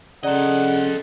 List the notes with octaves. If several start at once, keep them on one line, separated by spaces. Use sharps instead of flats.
C#3 A4 D5 D#5 F#5 A#5 C6